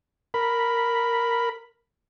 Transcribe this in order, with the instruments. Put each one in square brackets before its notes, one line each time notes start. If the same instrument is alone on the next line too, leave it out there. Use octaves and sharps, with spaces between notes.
[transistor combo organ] A#4 B5